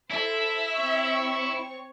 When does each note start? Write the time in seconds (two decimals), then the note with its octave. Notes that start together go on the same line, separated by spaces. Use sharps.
0.10 E4 A4 C5 E5
0.74 C4 C#5 C#6